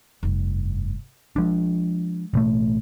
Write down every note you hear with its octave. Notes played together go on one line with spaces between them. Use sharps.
F1 G2
F3 G#3 D4
A1 B2 A3